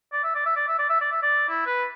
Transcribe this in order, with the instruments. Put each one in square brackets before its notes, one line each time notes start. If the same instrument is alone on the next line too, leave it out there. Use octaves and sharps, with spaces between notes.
[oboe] D5
E5
D5
E5
D5
E5
D5
E5
D5
E5
D5
E4
B4